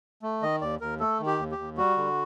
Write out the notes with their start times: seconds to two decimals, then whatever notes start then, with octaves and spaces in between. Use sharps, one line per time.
0.22 A3
0.42 D#3 D#5
0.62 D#2 D5
0.81 D#2 A#4
1.00 A3 A4
1.20 D#3
1.26 G4
1.39 D#2
1.52 G4
1.58 D#2
1.77 G3 F#4
1.97 D3